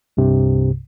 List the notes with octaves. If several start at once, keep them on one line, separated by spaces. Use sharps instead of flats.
C2 G2 C3